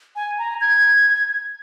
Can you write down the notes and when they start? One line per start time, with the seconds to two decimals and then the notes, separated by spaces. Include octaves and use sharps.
0.16 G#5
0.38 A#5
0.61 G#6